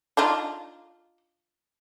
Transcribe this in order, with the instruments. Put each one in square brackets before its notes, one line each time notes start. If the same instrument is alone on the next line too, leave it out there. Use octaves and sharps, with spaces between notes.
[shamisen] D4 D#4 F4